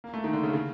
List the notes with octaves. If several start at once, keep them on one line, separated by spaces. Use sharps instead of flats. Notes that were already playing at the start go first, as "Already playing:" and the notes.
A#3
A3
D#3
D3
C#3
C#3